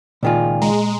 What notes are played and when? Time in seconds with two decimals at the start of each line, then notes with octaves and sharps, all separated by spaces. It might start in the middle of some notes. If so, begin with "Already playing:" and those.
0.23 C#2 A#2 D#3 F4 D5 G5 G#5
0.62 G#3 A#5